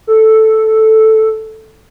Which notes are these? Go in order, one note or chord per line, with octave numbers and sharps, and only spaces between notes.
A4